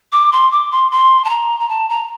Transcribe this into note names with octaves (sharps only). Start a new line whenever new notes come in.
D6
C6
D6
C6
C6
A5
A#5
A#5
A5
A#5